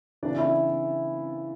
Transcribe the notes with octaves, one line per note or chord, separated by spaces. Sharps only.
C#3 E3 D4 D5
E4 E5